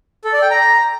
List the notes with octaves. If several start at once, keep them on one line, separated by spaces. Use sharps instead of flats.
A4
D5
G5
A#5